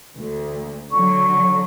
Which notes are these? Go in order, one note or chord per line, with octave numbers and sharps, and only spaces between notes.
D2
D3 F#3 C#6